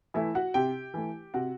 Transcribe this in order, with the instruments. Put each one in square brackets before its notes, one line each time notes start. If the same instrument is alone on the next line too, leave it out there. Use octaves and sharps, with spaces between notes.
[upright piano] E3 A3 E4 E5
F#4 F#5
C3 G4 G5
E3 A3
C3 F#4 F#5